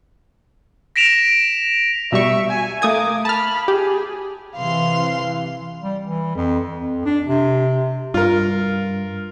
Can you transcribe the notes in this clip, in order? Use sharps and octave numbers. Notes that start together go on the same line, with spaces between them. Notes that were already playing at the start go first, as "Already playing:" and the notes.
A#6 B6 D7 E7 F7
B2 G3 E5 C#6
G#5
A3 A#3 D6 D#6 G#6
A5 B5 F6
G4 G#4
C3 E3 F5 C6
G3
E3
F2
F2
D4
C3
G2 F4 A#4